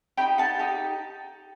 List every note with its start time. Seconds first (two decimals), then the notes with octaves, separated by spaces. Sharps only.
0.17 D#4 G4 G5 B5
0.38 F#5 A5
0.59 D#4 G4